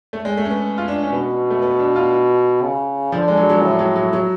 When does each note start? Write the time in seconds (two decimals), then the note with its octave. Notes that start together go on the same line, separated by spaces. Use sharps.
0.13 A3
0.25 G#3
0.37 A3
0.45 C#4
0.50 B3
0.78 F4
0.88 D4
1.03 C#4
1.12 B2 B3
1.50 A3
1.62 B3
1.79 D4
1.96 F4
2.62 C#3
3.12 D3 F3
3.28 G#3
3.37 F#3
3.50 F#3
3.62 A2
3.79 F#3
3.96 F#3
4.13 F#3